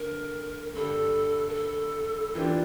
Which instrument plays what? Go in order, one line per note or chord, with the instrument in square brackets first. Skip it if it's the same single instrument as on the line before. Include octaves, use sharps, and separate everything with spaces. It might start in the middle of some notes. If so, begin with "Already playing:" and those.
Already playing: [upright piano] D3 [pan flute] A#4
[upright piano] G2 D3 G3 [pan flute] A4
[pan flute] A#4
A4
[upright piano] E3 A#3 D4 G4 [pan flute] F4